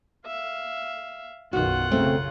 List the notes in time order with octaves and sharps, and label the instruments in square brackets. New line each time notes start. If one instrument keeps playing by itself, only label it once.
[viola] E5 F5
[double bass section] B1 F#2 D#3 [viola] F4 F#5 [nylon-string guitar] F#4
[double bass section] F#2 C#3 [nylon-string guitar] A3 C4